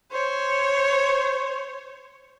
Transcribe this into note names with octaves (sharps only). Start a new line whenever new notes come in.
C5 C#5